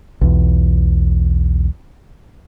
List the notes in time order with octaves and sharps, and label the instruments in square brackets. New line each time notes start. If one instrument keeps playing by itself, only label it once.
[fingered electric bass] B1 E2